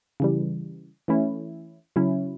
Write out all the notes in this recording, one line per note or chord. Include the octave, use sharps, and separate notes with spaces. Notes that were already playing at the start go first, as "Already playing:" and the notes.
C#3 E3 G3
E3 A3 C#4 E4
C#3 F#3 C#4 E4